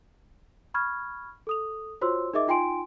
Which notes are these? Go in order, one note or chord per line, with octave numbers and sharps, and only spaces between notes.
B5 C#6 F6 G#6
A4 D#6 F7
F4 F#4 C5 C#5 C6 E6
D#4 G#4 A#4 D#5 E5 D6
D#4 F4 G5 G#5 C6 D7